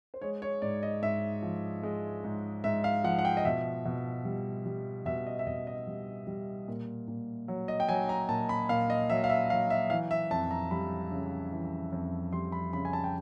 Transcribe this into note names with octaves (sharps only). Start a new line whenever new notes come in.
C5
G#3 C#5
C#5
G#2 D5
D#5
G#2 E5
F3
G#3
G#2
G#2 E5
F5
F3 F#5
F#5
G5
D#5
B2 E5
B2
G3
G3
B2 E5
D#5
E5
B2 D#5
D#5
G3
G3
A#2
A#2
F#3
D#5
G5
F#3 G#5
A#5
A#2 A5
B5
A#2 F5
D#5
F#3 E5
F5
E5
F#3 F5
E5
E3 F5
E5
F2 A5
A#5
G3 B5
C#3
E3
F2
G3 C6
B5
C#3 B5
G#5
A5
G5